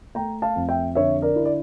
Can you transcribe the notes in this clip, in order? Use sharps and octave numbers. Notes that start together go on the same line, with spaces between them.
A3 G5 A#5
F5 A5
F2
E5 G5
D3 C#5 E5
A#4 D5
E4
D5